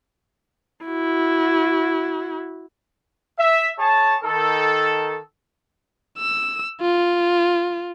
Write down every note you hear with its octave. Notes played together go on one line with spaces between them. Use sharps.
E4 F#4
E5
G#4 C#5 A5
D#3 A4
E6
F4